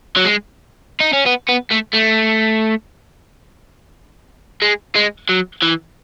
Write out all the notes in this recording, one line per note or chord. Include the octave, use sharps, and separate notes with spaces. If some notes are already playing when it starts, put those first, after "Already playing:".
F#3
G#3
D#4
C#4
B3
B3
A3
A3
G#3
G#3
F#3
E3